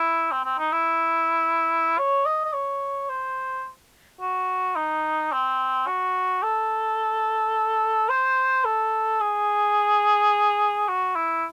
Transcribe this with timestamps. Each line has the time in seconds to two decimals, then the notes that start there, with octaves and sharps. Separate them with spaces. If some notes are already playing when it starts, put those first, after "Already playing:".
Already playing: E4
0.31 C4
0.44 C4
0.59 D#4
0.72 E4
1.98 C#5
2.26 D#5
2.45 D#5
2.53 C#5
3.09 C5
4.21 F#4
4.76 D#4
5.32 C4
5.87 F#4
6.43 A4
8.09 C5
8.65 A4
9.20 G#4
10.88 F#4
11.16 E4